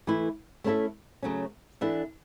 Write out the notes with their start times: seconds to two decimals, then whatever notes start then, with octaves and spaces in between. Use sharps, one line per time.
0.07 E3 A3 E4 B4
0.64 A3 C#4 E4 A4 E5
1.23 C#3 F#3 A3 C#4
1.81 E3 B3 D4 A4 E5